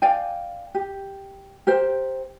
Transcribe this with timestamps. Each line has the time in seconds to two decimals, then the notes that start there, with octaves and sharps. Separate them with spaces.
0.02 D5 F5 G5 G#5
0.75 G4
1.67 G4 A#4 C5 G5